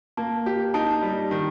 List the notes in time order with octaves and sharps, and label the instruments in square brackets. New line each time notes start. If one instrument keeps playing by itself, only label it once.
[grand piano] A#3 [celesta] A5
[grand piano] G4
[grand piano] D#4 [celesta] A5
[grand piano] G3
D#3